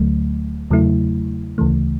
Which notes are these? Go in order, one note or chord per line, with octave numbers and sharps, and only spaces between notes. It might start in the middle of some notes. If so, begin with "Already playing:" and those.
Already playing: D2 D3 F#3 A3
E2 C#3 F#3 A3 E4
D2 C#3 E3 A3